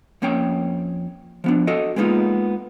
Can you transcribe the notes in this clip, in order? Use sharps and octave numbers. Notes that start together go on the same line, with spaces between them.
F2 A#3 C#4 C#5 G5
F3 B3 D4
F#4 A4 D#5
G#3 A#3 B3 C#4 D#4 F4